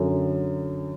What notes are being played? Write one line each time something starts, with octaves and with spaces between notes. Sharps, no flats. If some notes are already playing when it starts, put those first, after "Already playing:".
Already playing: F#2 D3 F#3